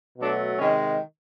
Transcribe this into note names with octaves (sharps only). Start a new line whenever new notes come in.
B2 F#3 A3 D4
C3 D#3 G#3 C#4